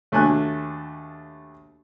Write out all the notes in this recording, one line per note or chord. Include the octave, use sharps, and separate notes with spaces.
D#2 A3 D4 F#4 G#5 F#6